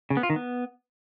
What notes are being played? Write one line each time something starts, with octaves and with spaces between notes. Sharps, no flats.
C#3
B3
F4
D#3
B3